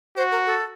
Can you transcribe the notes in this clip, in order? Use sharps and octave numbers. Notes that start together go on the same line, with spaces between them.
F#4 C5
A#4
A4